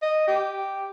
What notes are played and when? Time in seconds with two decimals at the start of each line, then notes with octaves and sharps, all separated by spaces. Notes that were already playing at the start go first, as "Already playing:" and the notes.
0.02 D#5
0.27 G4